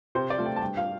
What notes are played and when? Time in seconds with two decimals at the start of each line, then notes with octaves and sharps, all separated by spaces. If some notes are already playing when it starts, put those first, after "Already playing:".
0.15 C3 C5
0.30 D5
0.38 A3 F4
0.46 G5
0.56 A5
0.62 G2 G5
0.77 F5